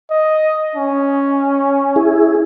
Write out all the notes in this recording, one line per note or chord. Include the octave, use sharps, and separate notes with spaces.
D#5
C#4
E4 G#4